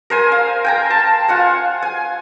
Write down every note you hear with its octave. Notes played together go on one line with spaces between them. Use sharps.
A#4 C5 G#5
F5
G5 G#5 A#5
A5
F4 F#5 G#5
G#5